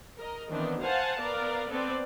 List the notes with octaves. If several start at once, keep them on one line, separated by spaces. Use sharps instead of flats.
A#4 D#5
D#3 E3 B3 C4 D4
C5 F5 F#5 G#5 A5
B3 A#4 D5 F5
B3 C4 A4 C5 D5